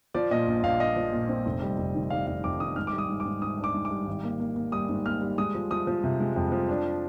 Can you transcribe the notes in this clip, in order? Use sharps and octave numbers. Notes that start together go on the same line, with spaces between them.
F3 D5
A#2 D#5
A#1
A#1 F5
A#2 D#5
F3
A#2
C4
F1
G3
F1
D#3
G3 F5
F1 F5
F2 D6
D#3 D#6
G#2 F6
D6
G3
D#6
G#2
D6
G#2
G#2 D#6
D4
D6
G#2
D6
G3
G#1
A#3
A#3
A#3
G3 D#6
G#2
A#3 F6
G3
G#3 D#6
F3
F3 D#6
F3
C3
G#3
F2
F3
D4